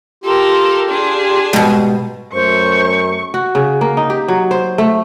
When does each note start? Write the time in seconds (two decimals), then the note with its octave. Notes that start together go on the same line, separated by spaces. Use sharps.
0.24 F4 G4 A4 A#4
0.88 D4 G#4
1.53 G#2 B2 G3
2.33 F#2 A3 C5 C#6
3.34 F#4
3.55 C#3
3.81 A#3
3.97 D#4
4.10 G4
4.28 F#3
4.51 C5
4.78 A3